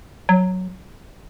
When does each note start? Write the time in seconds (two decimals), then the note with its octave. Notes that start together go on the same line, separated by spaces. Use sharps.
0.29 F#3